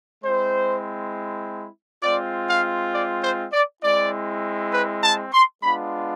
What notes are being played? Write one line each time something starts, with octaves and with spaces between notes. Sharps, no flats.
G#3 C4 E4 C5
G#3 C4 F4 D5
F5
D5
C5
D5
G#3 C4 E4 D5
B4
A5
C6
G#3 B3 D4 F4 B5